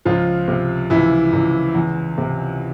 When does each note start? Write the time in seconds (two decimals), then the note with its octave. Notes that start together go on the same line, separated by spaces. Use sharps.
0.05 C#2 F3 F4
0.48 C3
0.90 C#2 E3 E4
1.33 C#2
1.75 E2
2.18 C3